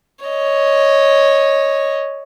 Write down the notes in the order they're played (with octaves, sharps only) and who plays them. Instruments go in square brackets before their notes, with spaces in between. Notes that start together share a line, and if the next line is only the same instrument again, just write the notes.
[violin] C#5 D#5